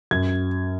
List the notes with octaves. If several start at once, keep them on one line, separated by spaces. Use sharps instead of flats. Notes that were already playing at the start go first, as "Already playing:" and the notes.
F#2 G#6